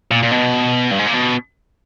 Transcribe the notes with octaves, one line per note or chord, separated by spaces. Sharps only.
A#2
A#2
B2
G2
G#2
A#2
B2